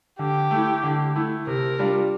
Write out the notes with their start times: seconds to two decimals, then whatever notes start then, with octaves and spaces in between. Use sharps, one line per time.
0.19 D3 G4
0.51 A3 E4
0.83 D3
1.16 A3 E4
1.47 C3 A#4
1.79 G3 D4 F4